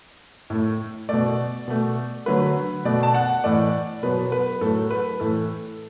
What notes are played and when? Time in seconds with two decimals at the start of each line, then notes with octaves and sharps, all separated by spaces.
0.50 A2 A3
1.09 B2 A3 D5
1.68 B2 A3
2.26 D3 F#3 A3 B4
2.85 B2 A3 D5
3.03 A5
3.14 F#5
3.44 A2 E3 A3 D5
4.03 B2 F#3 B3 B4
4.32 B4
4.61 A2 F#3 A3 A4
4.91 B4
5.20 A2 E3 A3 A4